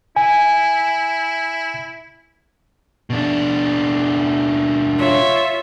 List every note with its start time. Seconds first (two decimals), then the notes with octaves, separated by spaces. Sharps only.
0.16 E4 G#5
3.10 B2 D4
4.98 F4 C#5 E5